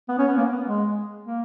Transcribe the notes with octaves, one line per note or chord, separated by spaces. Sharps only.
B3
C#4
B3
A#3
B3
G#3
A#3